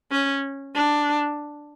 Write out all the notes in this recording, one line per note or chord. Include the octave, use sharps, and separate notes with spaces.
C#4
D4